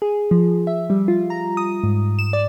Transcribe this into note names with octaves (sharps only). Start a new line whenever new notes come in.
G#4
F3
E5
G3
F4
A#5
D#6
G#2
E7
D5